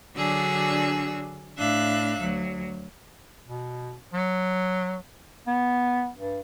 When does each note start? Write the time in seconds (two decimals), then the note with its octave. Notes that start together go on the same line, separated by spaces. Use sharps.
0.15 D3 F#3 D4 F#4 G#4 E6
1.58 A2 D4 E5 F5 F#6
2.20 D2 F#3
3.48 B2
4.14 F#3
5.47 B3
6.18 G2